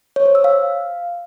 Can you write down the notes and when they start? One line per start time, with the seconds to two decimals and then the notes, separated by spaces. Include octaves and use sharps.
0.16 C#5
0.26 C5
0.35 E6
0.44 F5